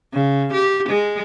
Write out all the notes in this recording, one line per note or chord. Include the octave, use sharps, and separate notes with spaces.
C#3
G4
G#3